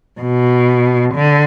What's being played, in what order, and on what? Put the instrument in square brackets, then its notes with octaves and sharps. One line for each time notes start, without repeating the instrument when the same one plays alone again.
[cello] B2
D3